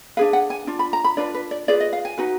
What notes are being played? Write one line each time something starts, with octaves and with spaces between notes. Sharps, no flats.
D4 G#4 B4 F5
F#5
G#5
D4 F4
B5
A#5
B5
D4 F4 B4 D5
B4
D5
F4 G#4 B4 D5
D#5
F5
G#5
D#4 F#4 B4